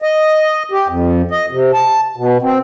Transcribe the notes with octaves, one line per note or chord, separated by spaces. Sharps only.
D#5
G4
F2
D#5
C3
A5
B2
C4